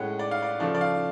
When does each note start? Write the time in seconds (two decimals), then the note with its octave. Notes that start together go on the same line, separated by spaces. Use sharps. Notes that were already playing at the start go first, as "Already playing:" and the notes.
Already playing: A2 G#3 C#4 F#5
0.19 D5
0.31 F5
0.43 D5
0.60 C#3 F3 A3 D5
0.75 D5
0.81 F5